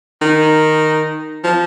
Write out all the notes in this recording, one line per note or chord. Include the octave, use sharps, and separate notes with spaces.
D#3
F3